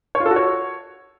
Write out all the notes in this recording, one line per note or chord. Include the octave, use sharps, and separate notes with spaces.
C#5
F4
A4
F#4
C#5